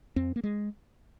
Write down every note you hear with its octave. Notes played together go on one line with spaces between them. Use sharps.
F2 C4
A#3
G#3